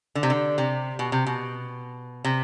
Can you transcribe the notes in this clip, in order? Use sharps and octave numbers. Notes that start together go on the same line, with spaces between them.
D3
C3
D3
C3
B2
C3
B2
C3